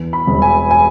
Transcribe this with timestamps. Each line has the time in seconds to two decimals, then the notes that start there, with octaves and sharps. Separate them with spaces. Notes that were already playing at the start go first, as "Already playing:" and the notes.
Already playing: E2
0.13 B5
0.27 E1
0.42 G#5
0.71 G#5